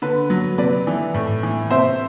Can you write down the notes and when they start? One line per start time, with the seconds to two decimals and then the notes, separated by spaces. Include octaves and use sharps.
0.02 D3 B4
0.30 F#3
0.58 C3 B4 D5
0.87 E3
1.14 A2
1.43 E3
1.70 C3 C5 E5